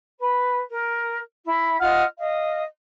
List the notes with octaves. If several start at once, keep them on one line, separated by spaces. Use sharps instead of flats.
B4
A#4
E4
F4 D#5 F#5 F6
D#5 F5